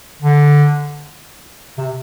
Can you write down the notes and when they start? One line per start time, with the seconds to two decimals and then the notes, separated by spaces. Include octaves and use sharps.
0.22 D3
1.78 C3